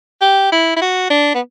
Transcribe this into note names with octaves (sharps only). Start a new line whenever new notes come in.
G4
E4
E4
F#4
D4
B3